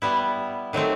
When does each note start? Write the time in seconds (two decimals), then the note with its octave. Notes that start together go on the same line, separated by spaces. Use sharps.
0.02 G3 B3 E4
0.73 D#3 F#3 A3 C4